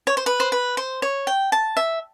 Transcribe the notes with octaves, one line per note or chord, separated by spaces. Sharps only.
C#5
C5
B4
C5
B4
C5
C#5
G5
A5
E5